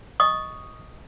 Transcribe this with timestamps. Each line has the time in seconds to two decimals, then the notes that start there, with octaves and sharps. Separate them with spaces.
0.20 D#5 C#6 D#6